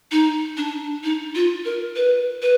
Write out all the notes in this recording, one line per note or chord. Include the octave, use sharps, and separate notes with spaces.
D#4
D4
D#4
F4
A#4
B4
B4